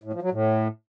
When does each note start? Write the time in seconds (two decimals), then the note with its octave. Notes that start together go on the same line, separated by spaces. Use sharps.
0.04 A2
0.13 F3
0.22 F#3
0.32 A2